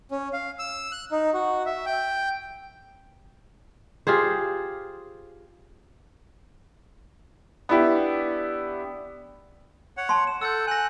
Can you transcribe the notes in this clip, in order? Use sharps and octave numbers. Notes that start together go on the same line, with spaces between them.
C#4
F5
E6
F#6
D#4
F#4
E5
G5
F4 G4 G#4 C5
B3 D4 E4 G4
C#5 F#5
A5 C6
E7
A4 F#5 E6 G6
G#5 F#6 A#6